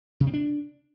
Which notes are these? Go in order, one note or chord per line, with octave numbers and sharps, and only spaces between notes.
C3
C4
D4